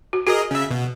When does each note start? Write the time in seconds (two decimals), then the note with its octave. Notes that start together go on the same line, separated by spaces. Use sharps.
0.13 F#4
0.27 F#4 G#4 A#4 D#5
0.51 C#3 E5
0.71 B2